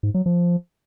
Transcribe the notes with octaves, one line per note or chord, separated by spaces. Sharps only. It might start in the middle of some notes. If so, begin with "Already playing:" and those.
G#2
F#3
F3